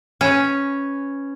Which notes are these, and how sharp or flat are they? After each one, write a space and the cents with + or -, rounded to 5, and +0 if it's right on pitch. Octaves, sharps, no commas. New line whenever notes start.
C#4 +0 B4 +10